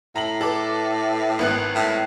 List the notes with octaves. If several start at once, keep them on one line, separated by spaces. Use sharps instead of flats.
A2 A#5 F#7
A4 B4 D6
G#1 B3 F#6
A2